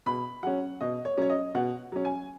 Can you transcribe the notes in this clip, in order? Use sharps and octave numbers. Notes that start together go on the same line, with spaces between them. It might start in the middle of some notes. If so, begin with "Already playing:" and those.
B2 B5
F#3 C#4 F#5
B2 D#5
C#5
F#3 C#4 C#5
D#5
B2 F#5
F#3 C#4
G#5